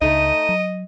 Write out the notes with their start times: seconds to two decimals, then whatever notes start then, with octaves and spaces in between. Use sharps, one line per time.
0.01 C#2 C#3 A3 D#4 D#5 D#7
0.49 F#3